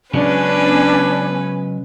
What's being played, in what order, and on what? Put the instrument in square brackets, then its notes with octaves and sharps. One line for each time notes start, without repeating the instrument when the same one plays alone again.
[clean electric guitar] C#3 F#3 G#3 [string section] B3 C#4 [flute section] D4 [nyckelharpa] B4